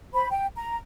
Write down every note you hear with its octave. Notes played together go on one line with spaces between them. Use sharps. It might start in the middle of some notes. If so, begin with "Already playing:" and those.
C5 B5
G5
A#5